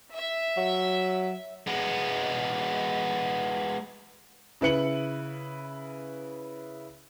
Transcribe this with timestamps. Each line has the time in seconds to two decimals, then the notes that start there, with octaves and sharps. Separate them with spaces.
0.15 E5
0.57 F#3
1.67 G#3 B3
4.61 C#3 E4 B4 C#7 F#7